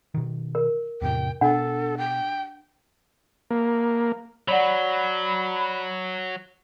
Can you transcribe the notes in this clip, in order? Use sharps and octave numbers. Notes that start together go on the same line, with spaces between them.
B2 D#3
A#4
E2 A2 C3 G5
B2 D4 A4 F#5
G5
A#3
F#3 C#5 D5 F#5 B5